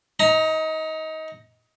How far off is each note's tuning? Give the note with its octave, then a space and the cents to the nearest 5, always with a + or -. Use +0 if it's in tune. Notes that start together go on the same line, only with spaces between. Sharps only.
D#4 +25 A#5 +0